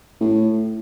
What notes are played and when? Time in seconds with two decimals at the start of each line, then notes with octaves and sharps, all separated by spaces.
0.21 A2